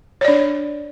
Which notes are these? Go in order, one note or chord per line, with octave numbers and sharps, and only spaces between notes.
D4 C#5 D5